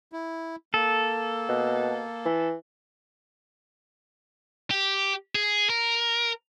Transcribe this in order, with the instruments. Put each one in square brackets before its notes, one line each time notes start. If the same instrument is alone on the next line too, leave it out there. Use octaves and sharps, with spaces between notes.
[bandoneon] E4
[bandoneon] A#3 [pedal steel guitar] A4
[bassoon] B2
E3
[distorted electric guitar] G4
G#4
A#4